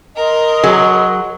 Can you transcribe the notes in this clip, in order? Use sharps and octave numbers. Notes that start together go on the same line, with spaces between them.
A#4 D#5 C6
F#3 G#4